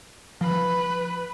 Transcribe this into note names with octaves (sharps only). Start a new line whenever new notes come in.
F3 B4